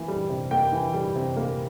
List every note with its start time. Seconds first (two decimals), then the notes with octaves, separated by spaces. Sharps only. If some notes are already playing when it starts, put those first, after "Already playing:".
Already playing: E3 A#3
0.08 G3
0.29 C3
0.51 A#3 G5
0.72 E3
0.94 G3
1.16 C3
1.37 A#3